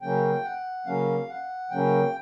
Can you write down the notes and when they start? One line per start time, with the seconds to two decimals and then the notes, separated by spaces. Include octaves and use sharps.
0.02 C#3 F#3 A#3 C#4 G5
0.44 F#5
0.86 C#3 F#3 A#3 C#4 F5
1.29 F#5
1.70 C#3 F#3 A#3 C#4 G5